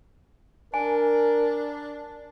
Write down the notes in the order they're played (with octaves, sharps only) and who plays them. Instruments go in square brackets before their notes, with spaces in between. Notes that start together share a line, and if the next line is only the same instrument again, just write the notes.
[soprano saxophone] D4 [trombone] A#4 [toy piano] G#5